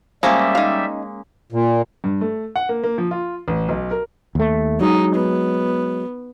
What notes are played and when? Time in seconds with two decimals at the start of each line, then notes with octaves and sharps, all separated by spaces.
0.23 F3 G3 G#3 A#3 C#4 E5
0.55 D#4 F5
1.52 A#2
2.04 G2
2.21 A3
2.56 F#5
2.69 A#3
2.84 A#3
2.98 F3
3.11 F4
3.48 A1
3.69 B1
3.91 A#4
4.35 D#2 A3
4.81 F#3 G#3 D#4
5.15 B3